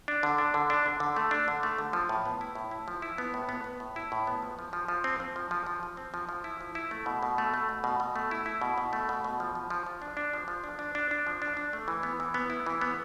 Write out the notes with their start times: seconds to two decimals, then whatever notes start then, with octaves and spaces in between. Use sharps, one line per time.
0.08 D4
0.23 D3
0.38 D4
0.54 D3
0.70 D4
0.86 D3
1.00 D3
1.16 A3
1.31 D4
1.48 D3
1.63 A3
1.78 D3
1.93 F3
2.09 A2
2.26 B3
2.41 E4
2.55 A2
2.71 E4
2.88 F3
3.02 E4
3.18 B3
3.34 A2
3.49 B3
3.64 B3
3.80 A2
3.96 E4
4.12 A2
4.27 B3
4.42 F3
4.59 F3
4.73 F3
4.88 F3
5.04 C4
5.20 C4
5.36 F3
5.51 F3
5.66 F3
5.83 F3
5.97 C4
6.14 F3
6.29 F3
6.44 E4
6.61 F3
6.75 E4
6.91 A3
7.06 B2
7.23 B2
7.38 A3
7.54 A3
7.69 B2
7.84 B2
8.00 B2
8.16 A3
8.31 E4
8.46 E4
8.61 B2
8.78 B2
8.93 A3
9.09 B2
9.24 B2
9.40 F3
9.55 F3
9.70 F3
9.87 F3
10.02 D4
10.17 D4
10.33 F3
10.48 F3
10.64 D4
10.79 D4
10.95 D4
11.11 D4
11.27 F3
11.42 D4
11.57 D4
11.73 A3
11.88 E3
12.03 B3
12.20 E3
12.34 B3
12.50 E4
12.66 E3
12.81 B3